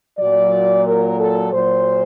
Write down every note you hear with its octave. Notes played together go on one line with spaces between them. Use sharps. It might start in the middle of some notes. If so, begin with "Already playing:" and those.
A#2 F#3 D5
A#4
A4
A#2 F#3 C5